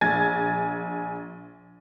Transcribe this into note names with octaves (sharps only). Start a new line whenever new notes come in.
A#1 G#5 G#6 A6